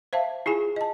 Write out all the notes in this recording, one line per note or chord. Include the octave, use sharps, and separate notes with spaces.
C5 E5 F5 A5
E4 F4 G#4 G#5
D#5 A5